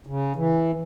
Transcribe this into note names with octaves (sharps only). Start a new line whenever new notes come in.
C#3
E3